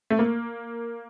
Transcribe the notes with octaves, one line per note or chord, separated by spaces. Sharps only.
A3
A#3